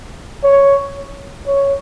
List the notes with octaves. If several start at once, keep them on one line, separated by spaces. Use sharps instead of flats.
C#5
C#5